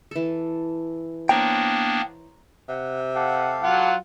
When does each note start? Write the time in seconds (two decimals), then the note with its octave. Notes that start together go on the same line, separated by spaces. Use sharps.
0.11 E3 A4
1.29 A#3 B3 D4 C5 C#5 G5 A#5
2.69 C3 F#5
3.15 G4 A4 F5 F#5
3.63 F#3 F4 F#5